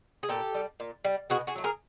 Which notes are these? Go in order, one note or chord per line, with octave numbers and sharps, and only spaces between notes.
G#4
A#2 G4 A4
G3
A#2
G3
B2 F#4 G#4
F#4 G#4
F#3 A3
G#4 A#4